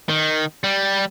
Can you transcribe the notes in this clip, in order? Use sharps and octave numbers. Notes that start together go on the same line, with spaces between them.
D#3
G3